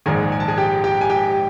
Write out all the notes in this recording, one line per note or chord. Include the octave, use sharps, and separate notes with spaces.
A#1 G#2 D#3 G#4 G#5
G#5
A5
G#4 G#5
G4 G5
G4 G5
G#5
G4 G5